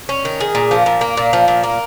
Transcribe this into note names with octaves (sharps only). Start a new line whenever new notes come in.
C#4
D#3
G#4
A#2
F3
A#2
A#3
A#2
F3
A#2
A#3